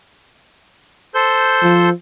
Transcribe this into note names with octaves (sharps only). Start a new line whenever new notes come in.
A4 C5 G6
F3